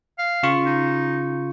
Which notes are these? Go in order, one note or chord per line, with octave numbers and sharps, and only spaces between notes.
F5
C#3 F4 C#6
D#4